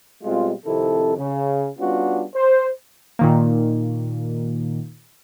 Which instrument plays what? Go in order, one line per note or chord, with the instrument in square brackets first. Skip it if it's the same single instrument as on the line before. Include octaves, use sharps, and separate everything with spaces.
[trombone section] B2 G3 G#3 C4 F4
F2 C3 D#3 E4 A4
C#3
G3 B3 C#4 D4 F4 F#4
C5
[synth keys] A#2 D#3 A#3